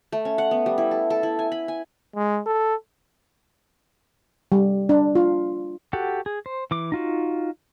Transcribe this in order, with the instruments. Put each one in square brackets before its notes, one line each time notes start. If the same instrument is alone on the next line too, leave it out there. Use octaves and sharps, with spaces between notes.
[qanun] A3
C#4
F#5
B3
G3
E4
A4
A4
E4
G#5
B5
G#5
[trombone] G#3
A4
[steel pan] G3
D4
F4
[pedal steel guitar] F#4 G4 A4 F#5
G#4
C5
E3 D6
D#4 F4 F#4